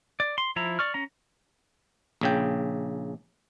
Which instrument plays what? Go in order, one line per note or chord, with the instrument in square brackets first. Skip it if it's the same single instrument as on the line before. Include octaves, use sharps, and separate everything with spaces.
[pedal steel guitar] D5
C6
F3 E4 A#5
D5 C#6 F6
C#4 A#5
[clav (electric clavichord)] A#1 C#3 G5